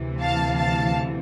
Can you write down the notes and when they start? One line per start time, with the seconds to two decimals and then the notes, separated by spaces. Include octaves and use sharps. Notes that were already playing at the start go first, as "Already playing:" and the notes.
Already playing: D2 C3 E3
0.21 F5 A5
0.58 F5 A5